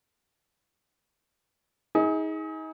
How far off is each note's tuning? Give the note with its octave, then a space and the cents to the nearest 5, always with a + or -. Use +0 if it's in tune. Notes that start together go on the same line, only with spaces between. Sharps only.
D#4 +35 G#4 +0